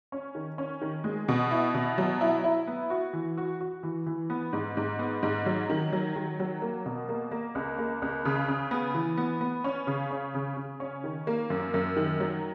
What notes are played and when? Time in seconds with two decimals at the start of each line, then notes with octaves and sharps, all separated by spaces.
0.12 C#4
0.35 D#3
0.58 C#4
0.82 D#3
1.04 G#3
1.28 B2
1.51 E4
1.74 B2
1.98 F#3
2.21 E4
2.44 E4
2.67 B3
2.90 F#4
3.13 E3
3.38 F#4
3.61 F#4
3.83 E3
4.07 E3
4.30 B3
4.53 G#2
4.77 G#2
4.99 B3
5.23 G#2
5.46 F#3
5.70 D#3
5.93 F#3
6.16 D#3
6.40 F#3
6.62 A#3
6.86 B2
7.09 A#3
7.31 A#3
7.55 C#2
7.78 A#3
8.02 C#2
8.25 C#3
8.48 C#3
8.71 B3
8.94 E3
9.17 B3
9.41 B3
9.64 C#4
9.87 C#3
10.11 C#4
10.34 C#3
10.57 C#3
10.80 C#4
11.04 D#3
11.27 A#3
11.50 F#2
11.74 F#2
11.97 D#3
12.20 F#3